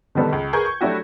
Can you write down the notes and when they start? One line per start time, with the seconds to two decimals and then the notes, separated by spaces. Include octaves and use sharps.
0.15 B2 D3 D#3 G3 B3 A4
0.33 C#2
0.53 G#4 A#4 B4 C#6 G6 G#6
0.66 C#6
0.81 F#3 A3 D4 E4 F#4 G4